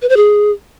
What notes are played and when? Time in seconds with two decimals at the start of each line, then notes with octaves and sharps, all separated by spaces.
0.02 B4
0.09 C5
0.16 G#4